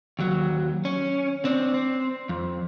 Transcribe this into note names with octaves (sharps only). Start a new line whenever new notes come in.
D#2 F#3
C#4
C4 D4
C4
F2